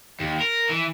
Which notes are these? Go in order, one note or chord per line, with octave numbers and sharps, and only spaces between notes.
D#2
A#4
E3